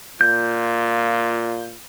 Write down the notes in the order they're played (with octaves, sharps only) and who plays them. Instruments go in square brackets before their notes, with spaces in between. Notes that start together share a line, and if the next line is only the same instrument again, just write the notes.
[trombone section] A#2 F4 [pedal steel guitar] G6